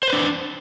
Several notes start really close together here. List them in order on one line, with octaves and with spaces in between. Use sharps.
C5 B4 D4